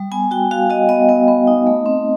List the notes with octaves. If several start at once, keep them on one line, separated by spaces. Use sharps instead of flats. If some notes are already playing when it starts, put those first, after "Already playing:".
Already playing: G3
B3 G#5
F#4 G5
F#4 F5
F#4 D#5
B3 D#5
B3
B3
D#4
A3
C4